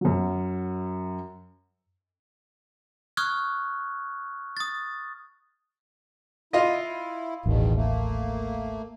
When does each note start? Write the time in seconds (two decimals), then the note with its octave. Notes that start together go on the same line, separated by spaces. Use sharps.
0.01 F#2 F#3
3.17 C#6 D#6 F6 F#6 G#6
4.57 D#6 A6
6.53 E4 F4 D#5
7.46 D#1 A1 E2 B2 D#3
7.76 A3 A#3